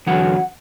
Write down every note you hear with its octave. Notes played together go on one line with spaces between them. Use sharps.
E2 D3 F#3 F#5